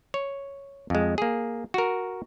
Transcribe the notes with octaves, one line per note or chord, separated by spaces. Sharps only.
C#5
F2 G#3
A#3 G#4
F#4 A#4